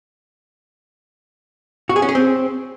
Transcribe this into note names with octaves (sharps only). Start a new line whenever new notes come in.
F#4
G#4
C#4
G#4
C4